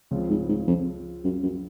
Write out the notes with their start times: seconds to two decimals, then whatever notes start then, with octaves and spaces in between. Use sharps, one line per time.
0.11 C#2 C#3 F3 C4 F4
0.30 G#2
0.49 G#2
0.67 F2
1.24 F#2
1.43 F#2